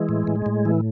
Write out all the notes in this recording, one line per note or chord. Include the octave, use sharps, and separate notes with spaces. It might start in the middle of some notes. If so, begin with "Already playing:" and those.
Already playing: E3 G#3
A2
A2
A2
E3